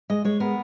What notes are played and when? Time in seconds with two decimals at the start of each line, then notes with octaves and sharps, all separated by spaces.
0.10 G#3 D#5
0.25 G#3 C#5
0.40 B3 A#4